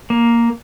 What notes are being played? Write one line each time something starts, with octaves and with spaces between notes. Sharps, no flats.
A#3